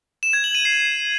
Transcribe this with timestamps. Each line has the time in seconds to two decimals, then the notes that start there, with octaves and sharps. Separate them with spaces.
0.23 E7
0.33 G#6
0.44 F#7
0.55 D#7
0.65 C7